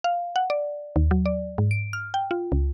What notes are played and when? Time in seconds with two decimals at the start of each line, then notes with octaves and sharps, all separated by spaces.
0.04 F5
0.36 F#5
0.50 D5
0.96 D#2
1.11 F#3
1.26 D5
1.58 G#2
1.71 D7
1.93 F6
2.14 G5
2.31 F4
2.52 C#2